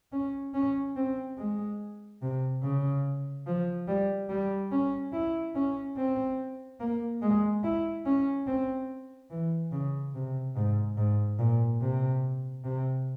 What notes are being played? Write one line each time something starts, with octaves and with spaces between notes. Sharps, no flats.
C#4
C#4
C4
G#3
C3
C#3
F3
G3
G3
C#4
E4
C#4
C4
A#3
G#3
E4
C#4
C4
E3
C#3
C3
G#2
G#2
A#2
C3
C3